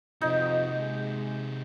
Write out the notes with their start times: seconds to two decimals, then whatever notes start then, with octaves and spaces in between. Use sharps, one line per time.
0.22 F2 C3 D#4 F#4 D#5
0.77 G#3